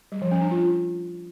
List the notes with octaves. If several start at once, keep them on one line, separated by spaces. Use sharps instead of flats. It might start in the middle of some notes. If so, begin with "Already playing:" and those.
G3
F3
C#4
D4
F4